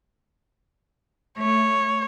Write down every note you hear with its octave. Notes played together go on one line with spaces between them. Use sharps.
A3 C#5